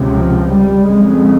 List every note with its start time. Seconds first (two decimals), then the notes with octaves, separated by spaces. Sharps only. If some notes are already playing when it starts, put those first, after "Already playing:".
Already playing: C#2 C3
0.13 F3
0.49 G3
0.84 F2 C#3 G#3